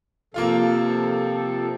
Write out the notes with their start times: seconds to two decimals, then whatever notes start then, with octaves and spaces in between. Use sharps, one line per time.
0.34 C3 F3 A#3 F4 A4 F5